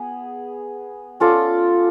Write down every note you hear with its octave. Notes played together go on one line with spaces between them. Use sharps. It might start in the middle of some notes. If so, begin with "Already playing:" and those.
Already playing: B3 G#4
C#4 F4 A4 D5